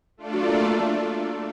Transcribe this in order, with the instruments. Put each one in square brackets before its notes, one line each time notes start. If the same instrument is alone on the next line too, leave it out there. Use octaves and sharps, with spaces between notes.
[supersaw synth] A3 D4 F4 A4 D5
[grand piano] F#3 F#4
A#3 A#4
A3 A4
A3 A4